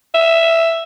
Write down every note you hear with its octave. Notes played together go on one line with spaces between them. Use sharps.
E5